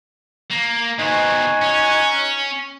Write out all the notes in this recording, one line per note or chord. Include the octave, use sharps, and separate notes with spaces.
A#3
B2 C4 D#4 F#4 G#5
C#4